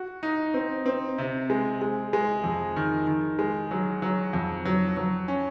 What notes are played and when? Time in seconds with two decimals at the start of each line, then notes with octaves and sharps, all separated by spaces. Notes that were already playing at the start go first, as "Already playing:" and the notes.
Already playing: F#4
0.23 D#4
0.54 C4
0.86 C4
1.18 C3
1.50 G#3
1.82 G#3
2.13 G#3
2.44 F2
2.76 D#3
3.07 D#3
3.39 G#3
3.71 F#3
4.02 F#3
4.33 F2
4.65 F#3
4.97 F#3
5.28 C#4